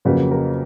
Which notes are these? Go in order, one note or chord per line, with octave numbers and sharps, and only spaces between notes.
F2 C#3 F#3 A#3 B4
A#4